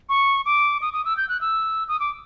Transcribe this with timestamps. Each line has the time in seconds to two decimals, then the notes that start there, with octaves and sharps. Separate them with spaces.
0.09 C#6
0.46 D6
0.82 D#6
0.93 D#6
1.05 E6
1.17 G6
1.29 F#6
1.41 E6
1.88 D#6
2.00 D6